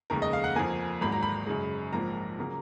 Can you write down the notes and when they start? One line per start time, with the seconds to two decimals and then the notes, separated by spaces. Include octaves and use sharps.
0.10 F1 D#2 C#3 G#3 A#4
0.22 D#5
0.33 F5
0.44 F#5
0.55 F2 F3 A#3 G#5
1.01 G#1 G#2 F#3 A#3 B5
1.12 A#5
1.23 B5
1.46 F#2 C#3 G#3
1.92 A#1 G#2 F3 A#3 A#5
2.39 C#3 F#3 A#3